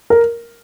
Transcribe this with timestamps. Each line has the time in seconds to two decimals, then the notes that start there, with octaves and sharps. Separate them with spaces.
0.10 A#4